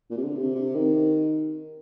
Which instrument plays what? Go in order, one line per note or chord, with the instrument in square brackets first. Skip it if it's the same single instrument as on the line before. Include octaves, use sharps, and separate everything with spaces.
[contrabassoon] A#2
C3
D3
C3
C3
D#3